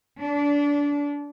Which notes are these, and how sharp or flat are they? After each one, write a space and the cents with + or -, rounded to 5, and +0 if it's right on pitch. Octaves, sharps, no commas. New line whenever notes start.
D4 -25